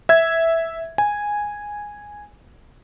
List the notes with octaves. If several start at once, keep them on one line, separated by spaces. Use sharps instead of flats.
E5 G#6
G#5